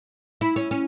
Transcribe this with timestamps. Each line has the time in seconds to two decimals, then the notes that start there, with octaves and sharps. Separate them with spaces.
0.41 E4
0.56 C#4
0.71 C#4